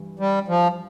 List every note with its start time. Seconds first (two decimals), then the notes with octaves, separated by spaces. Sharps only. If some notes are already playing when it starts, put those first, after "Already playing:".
Already playing: G2 E3
0.19 G3
0.48 F3